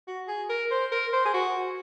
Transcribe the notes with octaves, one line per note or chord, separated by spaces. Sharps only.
F#4
G#4
A#4
C5
A#4
C5
G#4
F#4